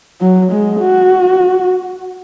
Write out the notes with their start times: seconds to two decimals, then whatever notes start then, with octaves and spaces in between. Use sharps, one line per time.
0.21 F#3
0.51 G#3
0.81 F#4